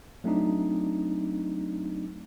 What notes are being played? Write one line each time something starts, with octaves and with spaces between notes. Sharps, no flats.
F#3 A3 C4 D4 D#4